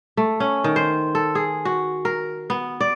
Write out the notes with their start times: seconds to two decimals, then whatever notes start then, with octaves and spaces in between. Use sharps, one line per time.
0.17 A3
0.40 C#4
0.64 D#3
0.76 C5
1.15 A4
1.35 G#4
1.65 F#4
2.05 A#4
2.50 B3
2.80 D5